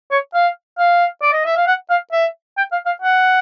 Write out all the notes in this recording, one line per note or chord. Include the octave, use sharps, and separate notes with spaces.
C#5
F5
F5
D5
D#5
E5
F5
F#5
F5
E5
G5
F5
F5
F#5